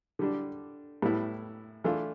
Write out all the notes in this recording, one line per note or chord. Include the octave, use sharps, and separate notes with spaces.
D3 G3 D4
A2 G3 B3 E4
E3 A3 D4 F4